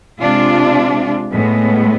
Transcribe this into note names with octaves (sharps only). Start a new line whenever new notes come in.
C3 G#3 D4 F4
A2 G#3 B3